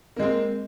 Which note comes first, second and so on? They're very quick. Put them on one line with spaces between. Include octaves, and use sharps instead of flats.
A#3 G#3 C4